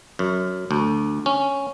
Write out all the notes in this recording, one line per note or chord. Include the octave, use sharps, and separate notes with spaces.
F#2
D2
C#4